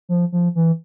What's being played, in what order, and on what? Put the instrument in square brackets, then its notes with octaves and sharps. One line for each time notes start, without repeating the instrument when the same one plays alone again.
[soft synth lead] F3
F3
E3